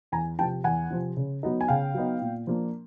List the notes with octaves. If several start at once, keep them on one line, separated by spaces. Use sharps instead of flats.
E2 G#5 A#5
C3 F3 G5 A5
E2 F#5 G#5
C3 F3
C#3
F#3 B3 D#4
G#5
C#3 F5 G5
F#3 B3 D#4
A#2
F3 A#3 D4